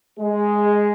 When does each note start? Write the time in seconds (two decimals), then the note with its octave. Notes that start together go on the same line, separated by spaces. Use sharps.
0.20 G#3